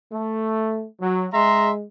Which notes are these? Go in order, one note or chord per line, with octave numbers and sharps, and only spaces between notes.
A3
F#3
G#3 E5 A#5 C6